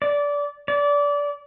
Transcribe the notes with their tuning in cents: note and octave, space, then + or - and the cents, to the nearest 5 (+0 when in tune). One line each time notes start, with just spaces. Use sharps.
D5 -20
D5 -25